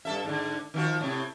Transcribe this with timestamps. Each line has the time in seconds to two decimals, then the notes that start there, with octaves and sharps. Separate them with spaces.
0.05 G2 A4 E5
0.25 G#2 D3
0.74 D#3 F3 F#4
1.01 A2 C3